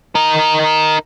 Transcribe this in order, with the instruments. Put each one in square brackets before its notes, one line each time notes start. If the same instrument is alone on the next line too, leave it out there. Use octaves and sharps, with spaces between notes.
[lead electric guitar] D#4 A#4